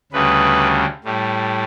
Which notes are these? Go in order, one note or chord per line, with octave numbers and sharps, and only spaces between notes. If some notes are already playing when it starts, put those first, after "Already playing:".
D2 C#3 G3 B4
A2 G3